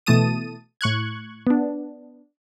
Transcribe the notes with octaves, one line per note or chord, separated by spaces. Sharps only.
B2 E3 A3 A5 D#6 D#7
A2 C#6 F#6 G#6
B3 D4